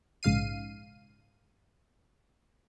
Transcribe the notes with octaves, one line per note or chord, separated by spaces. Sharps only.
A#1 G#2 C#3 F5 C7 D#7